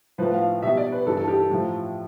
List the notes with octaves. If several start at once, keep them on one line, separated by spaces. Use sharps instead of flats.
A2 F3 B4
F5
B2 G3 E5
D5
B4
G2 E3 G3 A4
A4
G4
A4
A2 F3